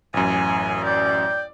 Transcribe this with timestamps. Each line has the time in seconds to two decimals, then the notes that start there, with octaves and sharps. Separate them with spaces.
0.14 A1 F#2 G#5
0.85 D5 G5